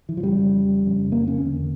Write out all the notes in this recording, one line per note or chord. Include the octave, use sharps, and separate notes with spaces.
E3
F3
F2 C#3 G3
F2 C#3
A#3
C#4
E2 D3